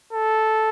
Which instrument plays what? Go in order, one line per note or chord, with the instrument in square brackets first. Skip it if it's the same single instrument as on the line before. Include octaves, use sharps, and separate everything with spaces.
[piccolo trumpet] A4